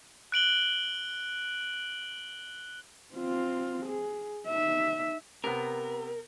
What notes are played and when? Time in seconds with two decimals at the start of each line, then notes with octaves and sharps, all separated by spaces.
0.32 F#6 D7 F#7 G7
3.15 C4 F4
3.86 G#4
4.47 D#4 E5
5.44 C3 B3 A#4